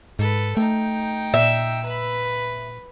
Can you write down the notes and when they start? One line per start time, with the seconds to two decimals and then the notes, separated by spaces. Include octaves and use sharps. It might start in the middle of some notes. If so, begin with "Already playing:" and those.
0.19 G#2 A4 B4
0.57 A3 D#4 G5
1.34 A#2 E5
1.84 B4 B5